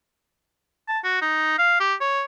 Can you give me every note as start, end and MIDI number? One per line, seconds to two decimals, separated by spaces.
0.88 0.99 81
1.04 1.21 66
1.22 1.53 63
1.58 1.80 77
1.80 1.94 67
2.01 2.23 73